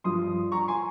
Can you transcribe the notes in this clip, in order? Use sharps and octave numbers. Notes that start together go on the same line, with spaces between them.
G2 F3 C6 D#6
A#5 C#6
G#5 C6